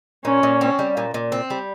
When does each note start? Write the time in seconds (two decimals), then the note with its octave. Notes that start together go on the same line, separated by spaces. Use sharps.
0.25 A#2 C#4
0.43 A#2
0.61 C4
0.79 G3
0.97 A#2
1.14 A#2
1.32 C4
1.50 G3